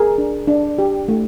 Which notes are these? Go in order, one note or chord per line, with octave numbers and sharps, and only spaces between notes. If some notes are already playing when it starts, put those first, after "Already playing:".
Already playing: G#4 A#4
D4
D4
G4
A3